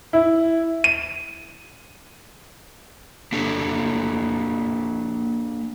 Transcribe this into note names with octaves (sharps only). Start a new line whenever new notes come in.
E4
D#7
A#3 D4 G4 A4